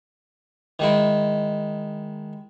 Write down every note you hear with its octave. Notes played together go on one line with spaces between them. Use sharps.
D#3 G#3 E4